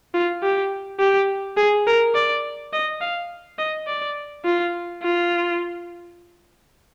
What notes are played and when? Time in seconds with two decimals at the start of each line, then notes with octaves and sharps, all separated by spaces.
0.14 F4
0.43 G4
0.99 G4
1.57 G#4
1.87 A#4
2.15 D5
2.73 D#5
3.01 F5
3.59 D#5
3.87 D5
4.45 F4
5.03 F4